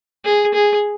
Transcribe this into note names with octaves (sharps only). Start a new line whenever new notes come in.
G#4
G#4